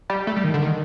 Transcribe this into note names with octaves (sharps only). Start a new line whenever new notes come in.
G3
A3
G3
D#3
D3
D#3